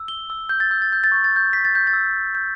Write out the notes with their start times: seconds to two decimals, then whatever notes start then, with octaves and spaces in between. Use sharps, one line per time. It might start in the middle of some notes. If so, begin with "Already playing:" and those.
Already playing: E6
0.08 G7
0.30 E6
0.49 G6
0.60 A6
0.71 E6 G6
0.82 A6
0.93 G6
1.04 A6
1.12 C#6 G6
1.24 A6
1.36 G6
1.53 G6 B6
1.65 A6
1.75 G6
1.87 A6
1.93 E6
2.35 G6